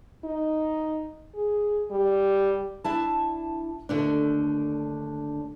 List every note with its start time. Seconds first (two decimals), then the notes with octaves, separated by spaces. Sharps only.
0.24 D#4
1.35 G#4
1.91 G3
2.84 D4 E4 A5
3.89 D#2 D3 A3 D4